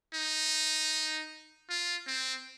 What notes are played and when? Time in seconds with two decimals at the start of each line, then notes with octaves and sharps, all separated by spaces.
0.14 D#4
1.69 F4
2.07 C4